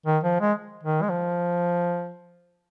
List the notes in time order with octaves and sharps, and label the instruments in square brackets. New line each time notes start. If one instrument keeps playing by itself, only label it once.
[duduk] D#3
F3
G#3
D#3
G#3
F3